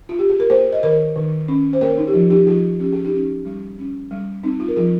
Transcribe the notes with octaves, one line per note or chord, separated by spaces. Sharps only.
F4
G4
G#4
A#4
A#3 G#4 C5
D#5
D#3 A#4 C#5
D#3
C#4
C5
A#3 A#4 C#5
D#4
G4
F3 F4
D#4 G4
F3 F4 G#4
C#4 G4
G#4
D#4 G4
C#4
G3
C#4
G3
C4 D#4
F4
A#4
F3 F4 G#4